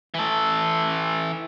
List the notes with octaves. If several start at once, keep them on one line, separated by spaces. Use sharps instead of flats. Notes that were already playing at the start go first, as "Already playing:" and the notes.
E3 A4